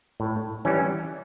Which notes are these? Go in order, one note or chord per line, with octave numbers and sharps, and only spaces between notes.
A2
E3 G3 C#4